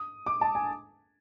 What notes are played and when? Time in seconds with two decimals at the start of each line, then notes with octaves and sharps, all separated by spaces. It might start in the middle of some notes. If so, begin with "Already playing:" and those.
Already playing: D#6
0.26 D6
0.41 A5
0.55 G#5